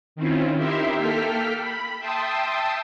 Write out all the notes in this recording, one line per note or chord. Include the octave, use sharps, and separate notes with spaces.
D#3 C4 C#4 E4 F4
D#4 E4 G4 A#4 E5 C6
A#3 A4 G5 F6 B6
B5
E5 G5 A5 C6 D#6